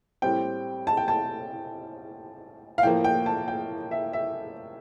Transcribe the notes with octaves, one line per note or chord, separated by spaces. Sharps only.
A2 G3 C4 G5
A5
G5
A5
F5
A2 F3 A#3 G5
G5
A5
G5
E5
E5